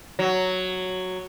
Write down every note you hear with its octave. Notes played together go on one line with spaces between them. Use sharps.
F#3